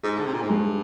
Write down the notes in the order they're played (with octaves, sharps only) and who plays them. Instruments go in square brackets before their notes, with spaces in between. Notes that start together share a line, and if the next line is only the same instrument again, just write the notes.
[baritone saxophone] G#2 [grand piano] G#4
[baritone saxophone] D3
C3
A#2
G#2
[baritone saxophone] G2 [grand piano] G#3